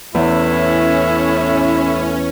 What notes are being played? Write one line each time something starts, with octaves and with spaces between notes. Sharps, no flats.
E2 A2 C#4 E4